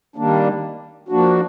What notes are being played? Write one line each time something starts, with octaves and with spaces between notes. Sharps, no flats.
D#3 G3 A#3 D4
F3 A#3 D4 F#4